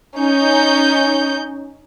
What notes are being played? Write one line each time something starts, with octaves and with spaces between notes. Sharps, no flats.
C#4 D#4 G6